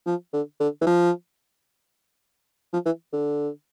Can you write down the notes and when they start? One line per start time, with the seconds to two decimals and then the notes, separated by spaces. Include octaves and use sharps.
0.06 F3
0.33 D3
0.60 D3
0.81 E3
0.86 F3
2.73 F3
2.85 E3
3.13 D3